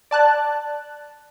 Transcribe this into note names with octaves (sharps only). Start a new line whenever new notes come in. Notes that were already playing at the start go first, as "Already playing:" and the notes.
D5 A5 F#6